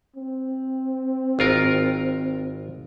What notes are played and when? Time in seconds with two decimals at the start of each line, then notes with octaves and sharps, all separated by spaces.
0.16 C4
1.39 G#1 F4 A#4